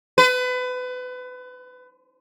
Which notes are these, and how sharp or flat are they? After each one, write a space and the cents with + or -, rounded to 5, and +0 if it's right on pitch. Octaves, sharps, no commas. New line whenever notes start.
B4 +30